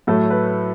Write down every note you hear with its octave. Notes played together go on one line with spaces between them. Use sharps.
A2 F#3 A3 A4
B4